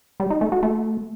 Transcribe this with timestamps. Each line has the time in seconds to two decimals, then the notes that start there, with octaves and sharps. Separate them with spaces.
0.20 G3
0.30 D#4
0.41 A3
0.52 F#4
0.63 A3